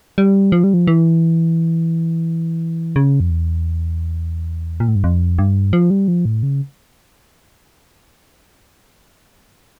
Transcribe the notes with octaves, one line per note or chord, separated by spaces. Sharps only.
G3
F3
G3
F3
E3
C#3
F2
E2
A#2
A2
G2
F2
G2
F3
G3
F3
A2
C#3